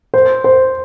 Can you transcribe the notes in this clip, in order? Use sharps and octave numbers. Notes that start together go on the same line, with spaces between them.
C5
C5